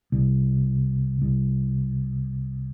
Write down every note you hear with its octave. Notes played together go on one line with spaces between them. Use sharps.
C2
C2